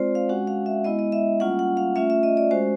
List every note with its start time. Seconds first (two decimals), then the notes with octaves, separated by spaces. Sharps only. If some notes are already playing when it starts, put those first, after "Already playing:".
Already playing: G#3 C4 F4 C5 D5
0.15 F5
0.29 G#3 C#4 F#4 F#5
0.47 F5
0.66 E5
0.84 G#3 B3 E4 D#5
0.99 D#5
1.12 E5
1.40 G3 A#3 C#4 F4 F#5
1.59 F#5
1.77 F5
1.96 A3 C#4 F4 E5
2.10 E5
2.23 D#5
2.37 D5
2.51 G#3 C#4 F#4 C5